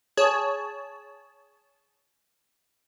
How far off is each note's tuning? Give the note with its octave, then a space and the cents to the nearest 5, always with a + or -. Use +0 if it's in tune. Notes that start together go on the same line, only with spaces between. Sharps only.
G#4 +0 C#5 +15 A5 -15